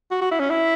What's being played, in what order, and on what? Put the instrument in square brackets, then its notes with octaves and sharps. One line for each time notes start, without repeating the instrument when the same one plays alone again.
[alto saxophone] F#4
F#4
E4
C#4
E4